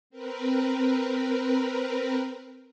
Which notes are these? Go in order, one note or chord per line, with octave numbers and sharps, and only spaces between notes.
C4 A#4 B4